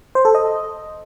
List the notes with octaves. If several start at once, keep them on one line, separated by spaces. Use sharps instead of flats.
C5
A4
D#5